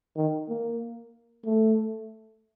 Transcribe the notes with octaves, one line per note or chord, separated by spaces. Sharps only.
D#3
A#3
A3